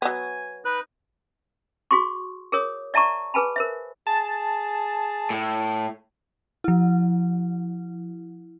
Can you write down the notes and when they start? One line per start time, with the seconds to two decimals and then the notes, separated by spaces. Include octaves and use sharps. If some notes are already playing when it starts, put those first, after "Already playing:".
0.02 F#3 B3 G#5
0.65 D#4 B4 F#6
1.91 F#4 G#4 C6 C#6
2.52 G#4 A#4 C#5 D#6
2.94 D5 E5 A5 A#5 C#6
3.34 G#4 B4 G#5 A5 B5
3.56 A#4 C5 E5
4.07 G#4 A5
5.30 A2
6.64 F3 E4